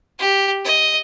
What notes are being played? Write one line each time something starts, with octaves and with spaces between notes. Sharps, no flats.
G4
D#5